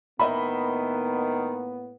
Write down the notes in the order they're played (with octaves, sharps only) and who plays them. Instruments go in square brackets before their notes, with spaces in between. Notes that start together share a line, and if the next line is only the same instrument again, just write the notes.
[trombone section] A2 A#3 B3 [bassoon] D#3 [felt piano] D#5 E5 B5